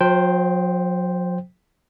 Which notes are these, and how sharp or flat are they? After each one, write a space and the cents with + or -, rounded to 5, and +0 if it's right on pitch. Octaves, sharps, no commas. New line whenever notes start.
F#3 -45 C5 +0 G5 +0